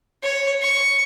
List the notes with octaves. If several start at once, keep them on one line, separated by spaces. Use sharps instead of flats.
C#5
C#6